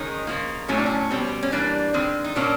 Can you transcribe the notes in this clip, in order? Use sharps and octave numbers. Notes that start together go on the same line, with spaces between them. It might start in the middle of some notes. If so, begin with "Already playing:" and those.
Already playing: D#3 G#3 C#4 D#4
C#3 F3 A#3
A2 F#3 A3 C#4
D4
C#4
B2 G3 C4
C#4
E3 G3 A#3 D4
D#3 G#3 C4
D#4
A#2 F#3 A#3 C#4 D4